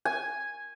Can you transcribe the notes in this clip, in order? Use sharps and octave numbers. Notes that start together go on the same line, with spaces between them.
G#5